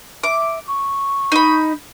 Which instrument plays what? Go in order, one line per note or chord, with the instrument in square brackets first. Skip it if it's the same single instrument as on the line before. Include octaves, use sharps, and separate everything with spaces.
[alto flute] E5 [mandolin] D6
[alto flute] C#6
[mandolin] D#4 B5